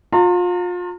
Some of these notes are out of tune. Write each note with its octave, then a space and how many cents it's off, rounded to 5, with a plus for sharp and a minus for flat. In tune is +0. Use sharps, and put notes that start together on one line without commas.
F4 +30 A#5 -40